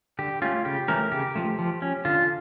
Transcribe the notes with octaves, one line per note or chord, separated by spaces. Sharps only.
D3 G4
A3 C#4 F4
C#3 G4
E3 A3 C#4 A#4
C#3 G4
F3 A3
F3
C#4
D3 F4